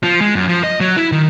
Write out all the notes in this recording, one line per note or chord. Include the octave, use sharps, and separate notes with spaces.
F3
G#3
F#2
F3
D#5
F#3
E4
D#3